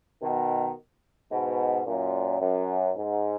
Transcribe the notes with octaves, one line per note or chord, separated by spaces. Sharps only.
B2 D#3
G#2 B2
F#2 A#2
F#2
G#2